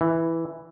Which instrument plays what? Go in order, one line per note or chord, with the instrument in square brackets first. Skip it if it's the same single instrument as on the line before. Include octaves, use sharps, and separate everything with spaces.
[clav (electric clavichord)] E3